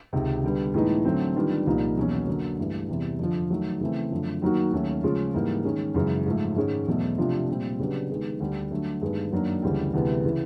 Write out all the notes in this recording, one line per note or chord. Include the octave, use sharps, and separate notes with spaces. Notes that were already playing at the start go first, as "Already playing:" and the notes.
C#2 C3 D#3
D3 G3 B3
A2 E3 G#3 B3 D#4
D3 F#3 A3 C4
D#3 G3 B3 D4 F4
C2 A#2 F3 A#3 D#4
E2 B2 F#3 A#3 C#4
D3 F#3 A#3
G2 E3 A3
E2 C3 E3 G3
F2 D3 F3
D#3 F#3 A3
C#3 E3 A3 C4
F#2 D3 F3 A3
D#3 F#3 A#3 D#4 F#4
D#2 D#3 F#3 A3 C#4
C#3 F3 G#3 C#4 F4
G#2 E3 G3 A#3
D#3 G#3 C#4
F#2 C#3 E3 G#3
G#2 F3 A3
G#2 D#3 G#3 C#4
E2 B2 F#3 A3
C3 F3 A3 D4 F4
A#2 G3 C4
C#3 F#3 B3 D4 G4
D#3 G#3 B3
D2 D3 G3
D3 F#3 A3
G2 D#3 G#3 B3
F#2 D#3 F#3 A#3 D4
D2 C#3 E3 G3
D2 C3 E3 G#3 B3
C#3 E3